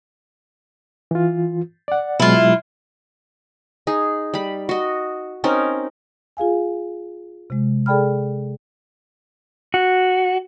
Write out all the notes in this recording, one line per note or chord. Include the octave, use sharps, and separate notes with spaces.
E3 F4
D5 F#5
B2 F#3 G#3 E4 F4
D#4 G#4
G3 B5
F#4 D#5
C4 C#4 D#4 A#4
F4 G#4 F5 G#5
C3 G#3
G#4 A4 D5 G5 B5 F6
F#4